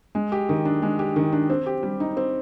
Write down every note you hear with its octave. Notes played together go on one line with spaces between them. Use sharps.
G#3
G4
D#3
D4
G#3
G4
D#3
D4
C4
G4
G3
D#4
C4